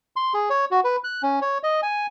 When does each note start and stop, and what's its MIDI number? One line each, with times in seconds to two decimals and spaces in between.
0.16 0.33 84
0.34 0.49 68
0.50 0.65 73
0.71 0.80 66
0.84 0.96 71
1.04 1.22 90
1.23 1.40 61
1.42 1.58 73
1.63 1.81 75
1.83 2.07 80